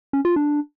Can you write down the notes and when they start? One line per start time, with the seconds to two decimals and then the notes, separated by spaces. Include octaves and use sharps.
0.13 C#4
0.25 F4
0.36 D4